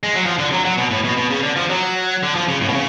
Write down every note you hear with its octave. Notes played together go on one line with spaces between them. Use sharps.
G#3
F#3
F3
D3
F#3
F#3
B2
A2
B2
B2
C#3
D3
F3
F#3
D3
F3
C#3
A2
B2
C#3